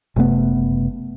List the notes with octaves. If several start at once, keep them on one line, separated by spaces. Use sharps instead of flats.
F#1 C3 A3 B3